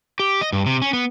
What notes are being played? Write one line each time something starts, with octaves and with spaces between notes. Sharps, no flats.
G4
D#5
G2
C3
C#4
B3